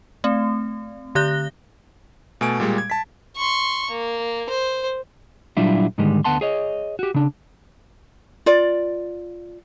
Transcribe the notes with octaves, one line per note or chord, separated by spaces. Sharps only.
A3 C4
D3 G4 D5 F#6 A#6 G7
B2 A3 G#5 D7
A#2 G3 G#3
G#6
A5 B6
C6 C#6
A#3
C5
A#2 F#3 G3 D4 E4 F4
G#2 D3 D#3 G3 G#3
D2 B3 F#5 A5 C6
G#4 C#5 D#5
F#4 G4
C#3 D4
F4 D5